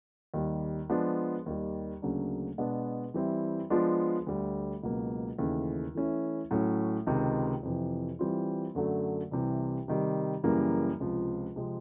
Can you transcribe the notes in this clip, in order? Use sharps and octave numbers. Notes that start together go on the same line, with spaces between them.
D#2 D#3 G3
F3 G#3 B3 D4
D#2 D#3 G3
D2 C#3 F#3 A#3 D4
B2 G#3 B3 D4
E3 G3 C4 E4
F3 G#3 B3 D4 F4
D2 D3 G3
C#2 B2 F#3 A#3
D#2 C#3 E3 A3
E3 A3 C#4 E4
A2 F#3 A3 C#4
C#2 C3 D#3
F2 C3 E3
E3 G3 C4 F4
F#2 D3 F#3 A3
C2 C3 E3
C3 D#3 G3
F#2 C#3 E3 G3 A#3
C#2 C3 F3
C3 F3 G#3 C4